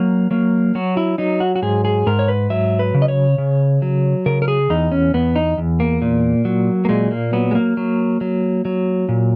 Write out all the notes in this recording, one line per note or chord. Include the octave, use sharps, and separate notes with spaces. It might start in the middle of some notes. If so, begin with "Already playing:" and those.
Already playing: F#3 A#3
F#3 A#3
F#3 F#4
E4
F#3 D#4
F#4
F#4
G#2 G#4
G#4
G#2 A#4
C#5
B4
F#3 E5
B4
C#3
D#5
C#5
C#3
F#3
C#3 A#4
A#4
G#4
E2 D#4
C#4
E2 B3
D#4
E2
A#3
A#2
F#3
A#3
A#2 G#3
A#3
F#3 B3
G#3
A#3
F#3
F#3
F#3
A#2